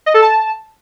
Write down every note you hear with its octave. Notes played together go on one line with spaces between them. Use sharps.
D#5
A4
A5